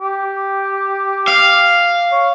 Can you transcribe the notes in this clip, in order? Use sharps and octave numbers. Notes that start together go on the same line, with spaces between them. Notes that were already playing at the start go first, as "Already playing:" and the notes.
G4
F5
C#5